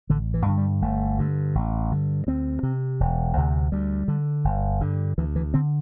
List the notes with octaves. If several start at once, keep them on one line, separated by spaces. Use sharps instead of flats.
A1 D3
E3
G2 D3
G3
G1 A3
G2 D3
A1
G2 D3
D2 C4
C3
E1
D2 C3
D2 G3
D3
G1
G2 D3
D2 E3
E3
D3 C4